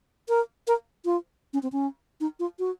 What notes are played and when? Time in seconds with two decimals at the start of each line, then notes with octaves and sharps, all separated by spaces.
0.29 A#4
0.67 A#4
1.05 F4
1.53 C#4
1.63 C4
1.72 C#4
2.20 D#4
2.39 F4
2.59 F#4